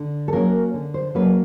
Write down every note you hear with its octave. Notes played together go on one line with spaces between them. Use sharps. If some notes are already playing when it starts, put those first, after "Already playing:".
Already playing: D3
A4
F#3 A#3 C#4 A#4
D3
C5
F#3 A#3 C#4 B4